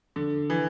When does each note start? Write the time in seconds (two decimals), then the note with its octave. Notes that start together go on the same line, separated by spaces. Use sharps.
0.16 D3
0.50 E3